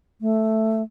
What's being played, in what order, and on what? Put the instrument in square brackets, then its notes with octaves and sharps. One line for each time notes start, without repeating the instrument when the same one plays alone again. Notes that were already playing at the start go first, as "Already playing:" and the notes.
[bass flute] A3